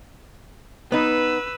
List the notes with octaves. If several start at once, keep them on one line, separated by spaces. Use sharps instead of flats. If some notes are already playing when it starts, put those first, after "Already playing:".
B3 D#4 B4 E6